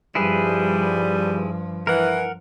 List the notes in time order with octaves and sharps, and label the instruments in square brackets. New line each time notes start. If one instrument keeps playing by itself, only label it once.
[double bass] G2 F3 [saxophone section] G3 [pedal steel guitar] E4 G#4 B4
[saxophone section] E3 [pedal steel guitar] A#4 F#5